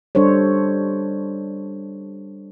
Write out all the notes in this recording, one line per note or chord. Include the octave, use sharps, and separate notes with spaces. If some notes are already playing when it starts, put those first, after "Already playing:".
G3 D4 A4 C5 C#5